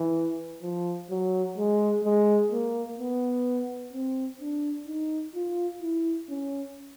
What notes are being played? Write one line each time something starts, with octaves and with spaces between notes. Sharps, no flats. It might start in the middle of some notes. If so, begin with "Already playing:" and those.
Already playing: E3
F3
F#3
G#3
G#3
A#3
B3
C4
D4
D#4
F4
E4
C#4